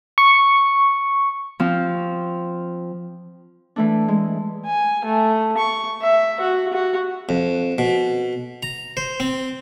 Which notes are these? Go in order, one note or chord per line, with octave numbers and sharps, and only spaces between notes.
C#6
F3 C4
E3 A3 D4
G#3
G#5
A3
C#6
E5
F#4
F#4
F2
B2
A#5
C5
C4